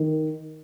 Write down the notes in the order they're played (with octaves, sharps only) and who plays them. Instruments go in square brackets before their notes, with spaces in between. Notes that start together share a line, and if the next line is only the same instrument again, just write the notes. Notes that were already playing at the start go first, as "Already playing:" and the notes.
Already playing: [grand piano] D#3